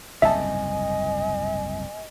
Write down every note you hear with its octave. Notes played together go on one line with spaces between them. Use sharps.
F#1 C2 G#2 D#5 E5 G#5 A5